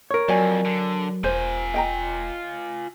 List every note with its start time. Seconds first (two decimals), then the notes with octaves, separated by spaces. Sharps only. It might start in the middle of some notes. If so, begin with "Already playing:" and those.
0.11 A#4 C#5
0.29 F2 F#3 D5 G#5
0.65 D3
1.24 E1 F4 C5 G#5
1.74 D#5 G5 A#5